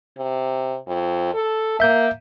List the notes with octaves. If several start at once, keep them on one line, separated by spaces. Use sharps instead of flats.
C3
F2
A4
A#3 E5 G6